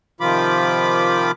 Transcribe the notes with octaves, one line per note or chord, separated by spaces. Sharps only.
C3 D#3 F3 F4 B5 D6